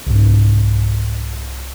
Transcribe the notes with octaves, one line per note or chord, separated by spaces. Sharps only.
C2 G#2